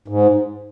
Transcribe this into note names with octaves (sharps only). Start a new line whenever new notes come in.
G#2